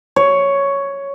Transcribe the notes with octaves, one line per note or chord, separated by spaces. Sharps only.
C#5